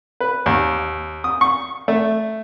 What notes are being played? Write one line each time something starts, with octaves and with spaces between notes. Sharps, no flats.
B4
D#2
D#6
C#6
A3